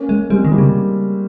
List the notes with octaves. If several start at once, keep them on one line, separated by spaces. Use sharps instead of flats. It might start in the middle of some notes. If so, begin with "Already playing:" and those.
Already playing: A#3 C#4
G#3
G3 G#3 C4
D#3
G3 A#3
C#3